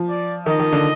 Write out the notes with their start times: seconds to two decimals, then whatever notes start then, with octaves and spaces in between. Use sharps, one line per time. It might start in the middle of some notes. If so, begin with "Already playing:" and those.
Already playing: F3
0.09 D5
0.46 D#3 D#5
0.60 D#3
0.73 D3